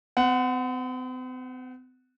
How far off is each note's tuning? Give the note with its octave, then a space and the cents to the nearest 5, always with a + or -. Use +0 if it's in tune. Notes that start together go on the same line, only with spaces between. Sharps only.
C4 -45 F#5 +0